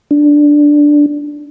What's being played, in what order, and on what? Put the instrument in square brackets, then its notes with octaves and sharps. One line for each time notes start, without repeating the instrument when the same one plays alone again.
[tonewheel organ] D4